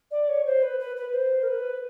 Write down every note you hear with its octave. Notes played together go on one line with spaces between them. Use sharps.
D5
C#5
C5
B4
B4
B4
C5
A#4
B4